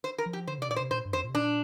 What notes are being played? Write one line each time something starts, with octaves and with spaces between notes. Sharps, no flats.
C5
A#4
F3
G4
D3 C5
C3 D5
A#2 D5
C5
C3
A#2 C5
G2
F2 C5
A#2
C3
A#2 D4